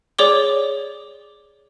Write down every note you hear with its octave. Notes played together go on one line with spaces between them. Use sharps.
G#4 C#5 D5 D6 G7